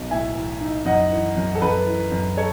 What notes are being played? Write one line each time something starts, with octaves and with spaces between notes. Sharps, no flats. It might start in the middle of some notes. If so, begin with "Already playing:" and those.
Already playing: B1
A2 E5 G#5
E3
D#4
F#2 D#5 F#5
E3
F#2
A4
F#2 B4
E3
F#2
A4 C#5